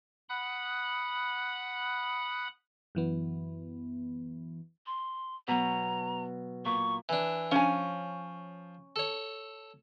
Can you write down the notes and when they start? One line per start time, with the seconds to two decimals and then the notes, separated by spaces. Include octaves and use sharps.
0.29 F#5 B5 D#6 F#6
2.95 F#2 E3 B3
4.87 C6
5.48 B2 F#3 A#5
6.65 A#2 C#6
7.09 E3 D4
7.52 F3 C#4 G#5
8.96 A4 C#5